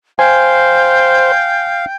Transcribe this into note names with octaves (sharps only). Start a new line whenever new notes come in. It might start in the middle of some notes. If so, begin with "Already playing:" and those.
C5 F5 G5 G#5